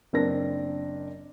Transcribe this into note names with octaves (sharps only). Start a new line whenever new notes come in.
F#1 C4 D4 A#4 A#6